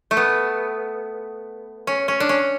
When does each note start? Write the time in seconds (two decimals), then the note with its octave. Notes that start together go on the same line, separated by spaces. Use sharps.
0.11 A3
0.17 B3
1.87 C#4
2.08 C#4
2.20 D4
2.29 C#4